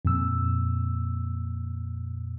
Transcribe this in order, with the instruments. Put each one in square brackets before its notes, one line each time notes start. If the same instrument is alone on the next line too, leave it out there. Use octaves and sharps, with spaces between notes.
[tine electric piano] F2 A#2 E6